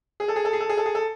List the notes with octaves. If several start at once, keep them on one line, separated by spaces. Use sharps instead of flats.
G#4
A4
G#4
A4
G#4
A4
G#4
A4
G#4
A4